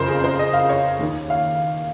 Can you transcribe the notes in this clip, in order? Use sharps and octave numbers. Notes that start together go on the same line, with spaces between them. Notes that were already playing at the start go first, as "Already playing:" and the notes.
Already playing: F#1 F2 C#3 A#4 C5
G#4
C5
D#5
F5
C#5
D#2 D#3
F5